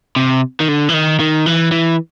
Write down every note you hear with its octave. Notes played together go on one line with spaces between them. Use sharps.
C3
D#3
D3
E3
D#3
D#3
E3
E3